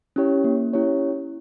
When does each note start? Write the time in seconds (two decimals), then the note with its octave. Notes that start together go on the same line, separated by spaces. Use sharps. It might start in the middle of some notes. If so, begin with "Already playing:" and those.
0.16 C#4 E4 G4 C#5
0.44 A#3
0.73 C#4 E4 G4 C#5